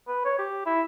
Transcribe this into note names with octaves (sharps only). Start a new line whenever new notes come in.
B4
C#5
G4
E4